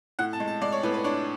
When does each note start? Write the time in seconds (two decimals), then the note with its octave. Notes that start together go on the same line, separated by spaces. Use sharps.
0.19 A2 F#5
0.33 A5
0.40 G#3
0.48 A5
0.61 G#3 D5
0.72 C#5
0.83 A2 B4
0.94 B4
1.04 D4 C#5